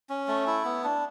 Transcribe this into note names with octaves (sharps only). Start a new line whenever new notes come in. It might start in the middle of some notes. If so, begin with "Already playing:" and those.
C#4
A3
E4
B3
D4